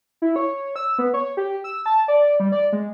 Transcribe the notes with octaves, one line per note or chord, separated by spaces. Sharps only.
E4
C#5
E6
B3
C#5
G4
E6
A5
D5
G3
D5
G#3